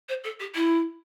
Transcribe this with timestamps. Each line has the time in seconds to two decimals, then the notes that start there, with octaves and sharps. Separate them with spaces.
0.08 C5
0.23 A4
0.39 G4
0.54 E4